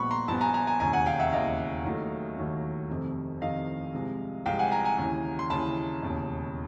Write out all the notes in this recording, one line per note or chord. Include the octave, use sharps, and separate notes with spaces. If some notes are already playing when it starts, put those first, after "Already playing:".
Already playing: A#1 A#2 G3 B3 B5 C#6
A#5 C6
A#1 A#2 G3 B3 A5 B5
G#5 A#5
G#5 A#5
G#5 A#5
E1 D#2 C#3 G#5 A#5
F#5 G#5
F5 G5
E5 F#5
E1 D#2 C#3 D#5 F5
D#2 D#3 F#3 A3
D#2 D#3 F#3 A3
F1 F2 C3 D#3
F1 F2 C3 D#3 D#5 F5
C2 C3 F3 G#3
C2 C3 F3 G#3 F5 G5
F#5 G#5
G#5 A#5
G#5 A#5
D#2 C#3 E3
C6
D#2 C#3 E3 A5 B5
E1 D#2 C#3